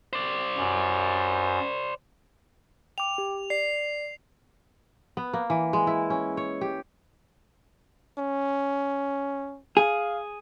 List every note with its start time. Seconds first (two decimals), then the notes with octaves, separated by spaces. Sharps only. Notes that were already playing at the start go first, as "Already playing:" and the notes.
0.13 C5 D5
0.57 F#2
2.98 G5 D6 F7
3.18 G4
3.50 D5 C7
5.17 B3
5.33 A#3
5.50 E3
5.73 G#3
5.87 E4
6.10 C#4
6.37 C#5
6.61 G4
8.18 C#4
9.77 G#4 F5